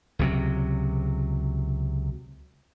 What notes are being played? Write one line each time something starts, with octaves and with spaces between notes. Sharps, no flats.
C#2 C3 F#3